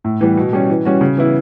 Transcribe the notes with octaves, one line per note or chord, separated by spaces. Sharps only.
A2
E3 G3 B3
B2
G3 C#4
E3
G3 C#4 F#4
C#3
E3 B3 E4